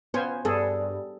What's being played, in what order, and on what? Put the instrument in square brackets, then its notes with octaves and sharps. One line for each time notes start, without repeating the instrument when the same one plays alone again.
[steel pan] B3 C5 G#5 [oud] C#4 F4
[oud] G2 [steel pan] B3 G#4 A4